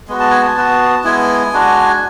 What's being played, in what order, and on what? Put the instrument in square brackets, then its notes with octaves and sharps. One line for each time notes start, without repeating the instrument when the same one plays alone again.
[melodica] G#3 B3 F#4
A5
G#5
A5
B3 F#4
G#3 B3 E4 G#5
G#3 D4 F#4